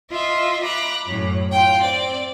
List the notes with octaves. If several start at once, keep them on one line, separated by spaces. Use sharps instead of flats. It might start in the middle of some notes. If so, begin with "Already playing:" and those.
F4 D#5 E5
A#5 B5 D6 F#6
F#2 A2
F4 G5
C4 D5